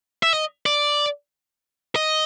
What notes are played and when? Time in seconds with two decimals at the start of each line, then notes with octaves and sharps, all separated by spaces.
0.23 E5
0.33 D#5
0.66 D5
1.96 D#5